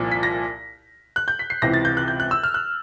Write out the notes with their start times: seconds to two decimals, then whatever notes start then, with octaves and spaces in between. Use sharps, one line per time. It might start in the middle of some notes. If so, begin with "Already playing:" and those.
Already playing: C2 A#2 F3
0.12 B6
0.23 A#6
1.16 F#6
1.28 G6
1.39 B6
1.50 C7
1.62 C#2 C3 E3 A#6
1.74 A6
1.85 G6
1.97 F#6
2.08 G6
2.20 F#6
2.31 E6
2.43 F6
2.54 F#6